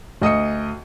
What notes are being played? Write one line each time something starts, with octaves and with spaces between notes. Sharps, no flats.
D2 D#5 D#6 C#7